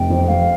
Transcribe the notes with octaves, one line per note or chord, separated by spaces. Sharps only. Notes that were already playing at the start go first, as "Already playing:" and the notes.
Already playing: F1 G5
F2
F1 F5